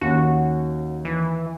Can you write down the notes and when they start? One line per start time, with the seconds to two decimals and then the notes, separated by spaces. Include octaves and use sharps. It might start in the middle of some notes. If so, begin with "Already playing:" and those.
0.01 D#2 C#4 F#4
1.05 E3